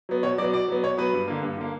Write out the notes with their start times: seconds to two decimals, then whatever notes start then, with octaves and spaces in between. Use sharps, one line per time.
0.09 F#3 B3
0.23 B2 C#5
0.38 F#3 B3 D5
0.53 B2 D5
0.68 F#3 B3
0.83 B2 C#5
0.97 F#3 B3 B4
1.13 G2
1.28 D3 A#3
1.42 G2
1.57 D3 A#3